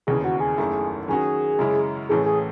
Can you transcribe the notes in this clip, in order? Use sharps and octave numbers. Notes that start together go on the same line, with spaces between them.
E1 D#2 C#3 E3 G#4
F#4
G#4
F#1 F#2 D#3 A3 E4
D#3 F#3 C#4 F#4 G#4
F#2 C#3 G#3 C#4 E4
A1 A2 E3 A3 G#4
G#4